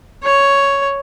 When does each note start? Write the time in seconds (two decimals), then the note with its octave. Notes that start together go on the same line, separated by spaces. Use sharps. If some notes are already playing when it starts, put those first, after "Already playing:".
0.24 C#5